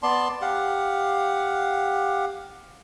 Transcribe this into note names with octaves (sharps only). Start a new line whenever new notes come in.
B3 D5 A5 C6
G4 F5 F#5